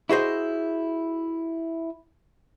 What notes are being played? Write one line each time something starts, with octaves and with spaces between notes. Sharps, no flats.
E4 F#4 G#4 C5 D#5